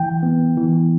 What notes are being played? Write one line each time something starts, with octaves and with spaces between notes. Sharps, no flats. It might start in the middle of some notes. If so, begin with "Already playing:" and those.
Already playing: E3 G5
B3
E3